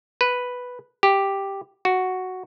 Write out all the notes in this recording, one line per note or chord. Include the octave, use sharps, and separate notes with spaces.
B4
G4
F#4